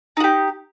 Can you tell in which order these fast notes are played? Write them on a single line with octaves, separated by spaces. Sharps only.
D#4 F#4 G4